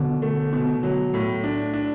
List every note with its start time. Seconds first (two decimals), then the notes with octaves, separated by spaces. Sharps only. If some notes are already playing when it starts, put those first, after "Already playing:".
Already playing: B2 D3
0.22 A3
0.53 B2
0.83 F#3
1.14 A2
1.44 D4
1.74 D4